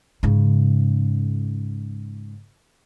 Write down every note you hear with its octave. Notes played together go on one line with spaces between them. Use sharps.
G#2 C#3